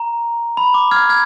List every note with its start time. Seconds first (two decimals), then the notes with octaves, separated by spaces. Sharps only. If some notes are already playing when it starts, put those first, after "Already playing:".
Already playing: A#5
0.57 B5
0.74 D6
0.91 F6 G#6
1.09 F6 G#6